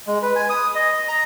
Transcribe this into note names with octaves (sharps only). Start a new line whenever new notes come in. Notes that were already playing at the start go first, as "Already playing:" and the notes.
G#3
B4
G#5
D#6
D#5
A#5